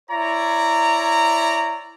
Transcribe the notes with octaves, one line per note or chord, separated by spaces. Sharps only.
E4 C#5 D5 A#5